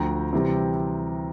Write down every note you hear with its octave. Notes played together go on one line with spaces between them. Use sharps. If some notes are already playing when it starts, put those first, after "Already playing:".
Already playing: D2 D3 F3 G5 A#5
C3 E3 G3 C4